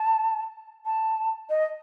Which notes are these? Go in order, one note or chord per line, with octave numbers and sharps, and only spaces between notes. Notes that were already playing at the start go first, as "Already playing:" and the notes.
Already playing: A5
A5
D#5